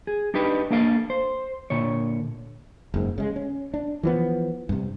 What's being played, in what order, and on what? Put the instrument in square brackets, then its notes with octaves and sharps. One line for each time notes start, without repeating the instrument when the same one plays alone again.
[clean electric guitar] G#4
D4 D#4 G4 B4
A#3 D4 A4 F5
C5
A#2 D3 C#5
[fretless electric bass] F#1 G#2
C#3 G#3
C#4
D4
E3 F3 B3
G2 C3